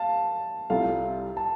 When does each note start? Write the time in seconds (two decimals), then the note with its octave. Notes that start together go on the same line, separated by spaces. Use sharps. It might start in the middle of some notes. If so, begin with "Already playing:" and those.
Already playing: F5 A5
0.70 C2 C3 G3 F4 A4 F5
1.37 A5